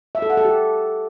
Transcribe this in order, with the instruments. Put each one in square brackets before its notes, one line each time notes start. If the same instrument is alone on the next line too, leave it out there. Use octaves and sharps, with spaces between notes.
[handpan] E5
A4
F#5
A4
G4